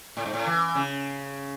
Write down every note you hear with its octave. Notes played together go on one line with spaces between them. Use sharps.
A2
G#2
A2
E3
C#3